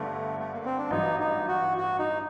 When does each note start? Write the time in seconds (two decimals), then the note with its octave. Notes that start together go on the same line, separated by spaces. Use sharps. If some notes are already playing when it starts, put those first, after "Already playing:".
Already playing: G1 G2 D3 A3
0.40 A3
0.53 A#3
0.65 C4
0.78 D4
0.90 A1 G2 F#3 D#4
1.20 D#4
1.48 F#4
1.77 F#4
1.99 D#4